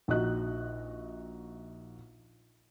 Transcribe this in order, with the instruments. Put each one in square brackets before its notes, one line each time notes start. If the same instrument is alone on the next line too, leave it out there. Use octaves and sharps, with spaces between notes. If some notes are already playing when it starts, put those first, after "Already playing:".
[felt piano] A#1 D#4 F#4 D#5 F#6